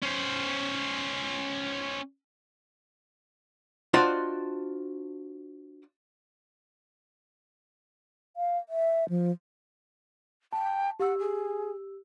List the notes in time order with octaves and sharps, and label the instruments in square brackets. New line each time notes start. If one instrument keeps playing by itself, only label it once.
[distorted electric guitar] C#4 C5
[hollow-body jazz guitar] D4 F4 F#4 C5 D5 D#5
[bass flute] F5
E5
F3
[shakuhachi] G5 [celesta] A5
[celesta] G4 E6 [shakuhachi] F#5
[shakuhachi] G#4